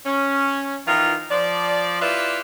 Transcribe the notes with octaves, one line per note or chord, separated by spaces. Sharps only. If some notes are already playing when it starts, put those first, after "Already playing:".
C#4
D#3 E3 F4
F3 D5
E4 F4 G4 B4 D5 E5